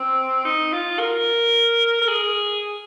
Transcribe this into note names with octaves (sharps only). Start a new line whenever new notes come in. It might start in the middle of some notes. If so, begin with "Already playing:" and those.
Already playing: C4
D#4
F4
A#4
A#4
G#4